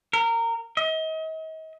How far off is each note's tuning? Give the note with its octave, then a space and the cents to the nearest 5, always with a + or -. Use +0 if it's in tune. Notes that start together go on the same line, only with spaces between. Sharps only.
A#4 -20
D#5 +40